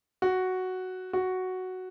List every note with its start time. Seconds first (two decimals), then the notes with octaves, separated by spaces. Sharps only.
0.22 F#4
1.13 F#4